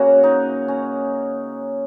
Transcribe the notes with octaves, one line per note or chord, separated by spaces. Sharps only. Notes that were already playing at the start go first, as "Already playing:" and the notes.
Already playing: C#3 A#3 C#4 F#4
D#4
C#4